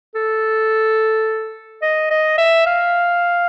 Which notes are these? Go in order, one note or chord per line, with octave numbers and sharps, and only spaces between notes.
A4
D#5
D#5
E5
F5